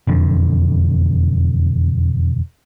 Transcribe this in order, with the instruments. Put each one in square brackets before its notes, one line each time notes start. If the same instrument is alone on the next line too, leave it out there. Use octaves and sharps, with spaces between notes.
[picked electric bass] E1 F2 D3